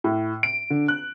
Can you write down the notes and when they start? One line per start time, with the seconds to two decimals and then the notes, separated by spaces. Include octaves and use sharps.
0.04 A2
0.43 D7
0.70 D3
0.88 F#6